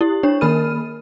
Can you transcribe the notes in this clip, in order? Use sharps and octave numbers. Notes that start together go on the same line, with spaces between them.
E4 G4
D4 C#5
D#3 A#3 A#4 B5 F6 D#7